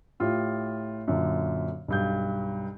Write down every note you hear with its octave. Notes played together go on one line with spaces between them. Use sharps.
A2 F4 G4
F#2 A#2 D3
B1 G2 G6